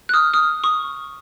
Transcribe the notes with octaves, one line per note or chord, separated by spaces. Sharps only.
F#6
D#6 F6
D#6 F6
C#6 D#6